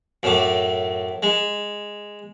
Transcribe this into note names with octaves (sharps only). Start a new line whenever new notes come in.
F#2 A2 D6
G#3